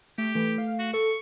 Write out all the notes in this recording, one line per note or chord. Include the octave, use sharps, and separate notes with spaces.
A3 G4
E3 A3
F5
F#4
A4 C#6